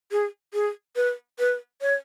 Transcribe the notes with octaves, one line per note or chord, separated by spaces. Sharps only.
G#4
G#4
B4
B4
C#5